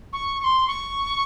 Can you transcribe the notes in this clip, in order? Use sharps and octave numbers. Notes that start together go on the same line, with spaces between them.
C#6
C#6
C6
C#6